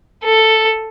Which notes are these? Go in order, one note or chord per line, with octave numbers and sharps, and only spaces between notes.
A4